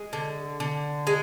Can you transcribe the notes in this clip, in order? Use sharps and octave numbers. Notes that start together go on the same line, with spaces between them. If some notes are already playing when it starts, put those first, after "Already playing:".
Already playing: G#3
D3
D3
G#3